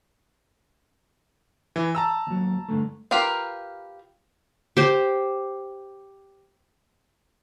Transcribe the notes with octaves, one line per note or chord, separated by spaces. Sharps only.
E3
A5 A#5 E6
D#2 F#3
G2 D3 A3
F4 G4 A#4 B4 F5
G4 C5